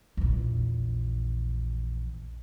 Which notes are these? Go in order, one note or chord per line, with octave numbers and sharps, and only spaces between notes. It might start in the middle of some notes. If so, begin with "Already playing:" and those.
A#1 E2